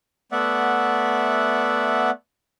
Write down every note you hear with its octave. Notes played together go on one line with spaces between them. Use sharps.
A3 B3 D5 E5 F#5